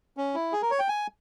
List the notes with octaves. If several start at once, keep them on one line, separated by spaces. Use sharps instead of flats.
C#4
E4
G#4
A#4
C#5
G5
G#5